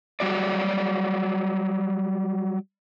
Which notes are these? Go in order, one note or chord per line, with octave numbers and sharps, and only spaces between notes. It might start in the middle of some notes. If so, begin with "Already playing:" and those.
F#3 G3 F#4 D5